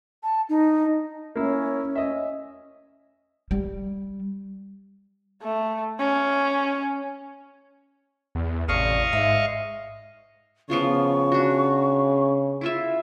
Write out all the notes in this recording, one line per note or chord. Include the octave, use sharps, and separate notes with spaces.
A5
D#4
A#3 C#4 E4
D#5 E5
G3
A3
C#4
E2
A1 C3 D5 D#5 F5 A5 C#6
G#2 G#3 E5
C#3 F3 B3 F4 C#6
D4 F#4
E4 F4 E5